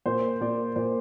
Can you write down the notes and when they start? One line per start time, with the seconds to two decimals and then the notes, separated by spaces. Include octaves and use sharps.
0.06 A#2 C5
0.41 A#2 D5
0.76 A#2 C5